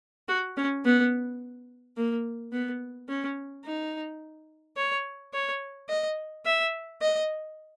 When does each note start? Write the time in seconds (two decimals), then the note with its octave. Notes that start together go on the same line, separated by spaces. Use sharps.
0.28 F#4
0.57 C#4
0.85 B3
1.97 A#3
2.53 B3
3.09 C#4
3.65 D#4
4.77 C#5
5.33 C#5
5.89 D#5
6.45 E5
7.01 D#5